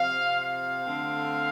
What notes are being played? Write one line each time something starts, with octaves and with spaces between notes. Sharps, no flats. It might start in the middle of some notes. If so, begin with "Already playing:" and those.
Already playing: C3 F3 C4 F5
F5
D3 A3 C4